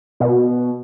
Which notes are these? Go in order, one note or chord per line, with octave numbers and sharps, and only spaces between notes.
B2